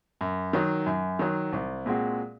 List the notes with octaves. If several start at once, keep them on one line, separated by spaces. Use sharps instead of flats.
F#2
D#3 F#3
F#2
D#3 F#3
C2
A#2 G#3 C4 F#4